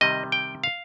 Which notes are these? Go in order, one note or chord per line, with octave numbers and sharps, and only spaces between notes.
C3 D#3 G3 D#5
G5
F5